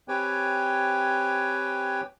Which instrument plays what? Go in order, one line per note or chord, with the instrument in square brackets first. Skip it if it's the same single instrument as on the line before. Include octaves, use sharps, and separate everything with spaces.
[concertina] C4 G4 B4 C#5 G5 G#5